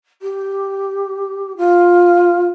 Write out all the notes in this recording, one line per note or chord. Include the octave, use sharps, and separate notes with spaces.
G4
F4